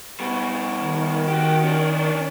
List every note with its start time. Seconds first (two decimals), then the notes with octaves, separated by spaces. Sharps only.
0.20 B2 G3
0.81 D#3
1.28 F#4 G4
1.63 C#4 D4